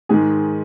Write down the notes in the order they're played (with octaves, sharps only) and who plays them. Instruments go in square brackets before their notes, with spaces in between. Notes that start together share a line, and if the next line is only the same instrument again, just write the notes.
[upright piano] G#2 D#3 G#3 G#4